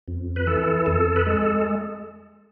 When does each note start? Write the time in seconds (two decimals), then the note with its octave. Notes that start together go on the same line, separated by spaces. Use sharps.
0.08 F2
0.36 B4
0.47 E3 A4
0.86 F2 A4
1.16 B4
1.26 G#3 A4